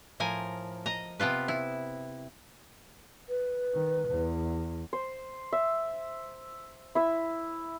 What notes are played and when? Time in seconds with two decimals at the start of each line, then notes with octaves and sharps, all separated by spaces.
0.20 A2 F3 A#4 G#5
0.86 D#5 A#5
1.20 C3 B3 F4 B4
1.48 E4
3.29 B4
3.74 D#3
4.09 E2
4.93 C5
5.52 E5
6.95 E4 E5